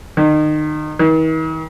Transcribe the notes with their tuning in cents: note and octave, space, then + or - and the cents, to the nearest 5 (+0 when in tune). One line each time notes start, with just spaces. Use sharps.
D#3 -30
D#3 +45